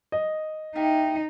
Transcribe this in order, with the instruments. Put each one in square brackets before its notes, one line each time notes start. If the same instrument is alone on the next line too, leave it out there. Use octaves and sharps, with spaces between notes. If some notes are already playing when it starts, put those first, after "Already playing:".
[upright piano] D#5
[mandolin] A#3 E4 G4 [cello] D#4